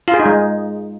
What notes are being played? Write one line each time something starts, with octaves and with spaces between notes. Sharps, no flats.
F4
G#4
D#4
G#3